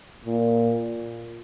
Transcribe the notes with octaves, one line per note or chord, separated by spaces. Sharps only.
A#2